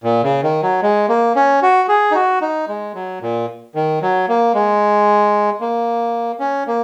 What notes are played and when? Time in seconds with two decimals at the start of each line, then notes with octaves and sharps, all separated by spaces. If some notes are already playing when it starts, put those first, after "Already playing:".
0.04 A#2
0.23 C#3
0.43 D#3
0.63 F#3
0.82 G#3
1.09 A#3
1.36 C#4
1.63 F#4
1.89 G#4
2.11 D#4
2.15 F#4
2.42 D#4
2.68 G#3
2.95 F#3
3.22 A#2
3.75 D#3
4.02 F#3
4.28 A#3
4.54 G#3
5.60 A#3
6.40 C#4
6.67 A#3